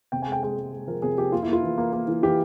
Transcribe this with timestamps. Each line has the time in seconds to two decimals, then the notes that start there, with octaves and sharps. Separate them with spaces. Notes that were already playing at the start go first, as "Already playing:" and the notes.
0.12 C3 G5
0.22 G#5
0.27 G#3
0.32 G5
0.43 G#3 G5
0.57 G#3
0.73 G#3
0.87 F3 A#4
1.02 C3 G#4
1.18 F3 G4
1.32 A#3 F4
1.43 E4
1.48 A#3
1.53 F4
1.63 E3
1.78 A#3
1.93 A#3
2.08 E3
2.23 E3 G4